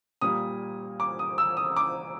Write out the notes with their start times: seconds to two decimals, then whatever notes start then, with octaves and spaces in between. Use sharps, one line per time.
0.21 A#2 G3 A#3 D#6
1.00 D6
1.19 D#6
1.38 E6
1.57 D#6
1.77 D6